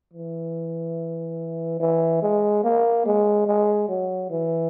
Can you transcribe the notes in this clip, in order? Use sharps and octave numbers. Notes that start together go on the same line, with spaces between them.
E3
E3
G#3
A#3
G#3
G#3
F#3
E3